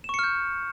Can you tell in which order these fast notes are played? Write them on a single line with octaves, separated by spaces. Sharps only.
E7 C#6 C#7 F6 G6